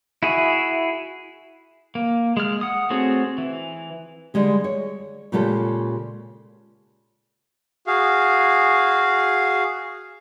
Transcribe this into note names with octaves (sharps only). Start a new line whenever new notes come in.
E4 F#4 G#4
A#3
G#3 F6
F#5 D#6
A3 C4 C#4 F#4 G#4
E3
D3 G3 G#3 G#4
C#5
A#2 C#3 G#3 F4 G4 A4
F#4 G#4 F5